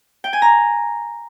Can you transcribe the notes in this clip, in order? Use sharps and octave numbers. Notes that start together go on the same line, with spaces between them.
G5
G#5
A#5